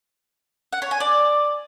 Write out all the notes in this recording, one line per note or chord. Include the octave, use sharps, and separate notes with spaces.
F#5
C#5
G#5
D5